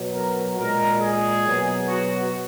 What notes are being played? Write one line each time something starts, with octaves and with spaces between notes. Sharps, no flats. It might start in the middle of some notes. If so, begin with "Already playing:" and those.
Already playing: B2 F#3
A#4
A#2 G#3 A#4
G#4
B2 F#3
F#4